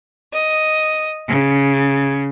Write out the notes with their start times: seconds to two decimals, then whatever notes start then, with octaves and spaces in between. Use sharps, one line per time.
0.33 D#5
1.27 C#3